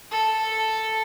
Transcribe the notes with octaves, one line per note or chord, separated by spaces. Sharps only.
A4